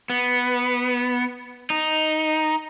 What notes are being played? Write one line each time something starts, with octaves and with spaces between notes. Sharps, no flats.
B3
D#4